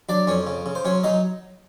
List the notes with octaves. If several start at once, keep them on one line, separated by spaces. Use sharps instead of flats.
F#3 D4 D5
F2 C#4 C#5
C#3
C#3
C5
F#3 C#4 C#5
F#3 D#4 D#5